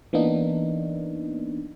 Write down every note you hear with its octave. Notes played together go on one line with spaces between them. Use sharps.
E3 A#3 B3 D4 D#4